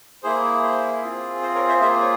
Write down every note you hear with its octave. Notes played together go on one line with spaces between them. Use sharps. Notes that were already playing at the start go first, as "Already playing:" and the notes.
A#3 E4 G#4 C5
C5
C4 F4 G#4
C5
A#4 C#5
C5 E5
A#3 F4 G#4 C5 E5
C#5